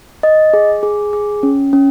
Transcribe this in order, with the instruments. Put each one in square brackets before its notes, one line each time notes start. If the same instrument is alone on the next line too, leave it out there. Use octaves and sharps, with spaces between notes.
[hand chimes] D#5
G#4
G#4
G#4
C#4
C#4